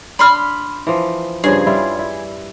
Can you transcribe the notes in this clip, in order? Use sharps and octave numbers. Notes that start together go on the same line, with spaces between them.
D4 B5 C6 F6
E3 F3
G2 C#3 F3 G#4
G3 E4 F4
E4